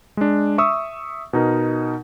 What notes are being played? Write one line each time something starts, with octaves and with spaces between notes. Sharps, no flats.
G#3 D4
E5 C#6 D#6 E6
B2 D#4 A#4